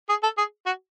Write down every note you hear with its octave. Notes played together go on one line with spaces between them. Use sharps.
G#4
A4
G#4
F#4